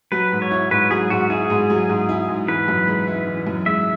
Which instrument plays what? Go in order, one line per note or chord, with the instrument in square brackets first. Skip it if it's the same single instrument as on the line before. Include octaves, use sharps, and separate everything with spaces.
[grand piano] F#3 [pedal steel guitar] B4
[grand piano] G#2
[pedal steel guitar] C#5
[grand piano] E4
[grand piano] G#2 [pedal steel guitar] B4
[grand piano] F#3 [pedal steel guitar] G#4
[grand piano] G#2 [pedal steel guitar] F#4
[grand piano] E4 [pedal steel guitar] G#4
[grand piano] G#2
F#3
G#2
E4
G#2
[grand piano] E3 [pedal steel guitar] B4
[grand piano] F#2
G#3
E4
E3
F#2
[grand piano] G#3 [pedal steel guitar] E5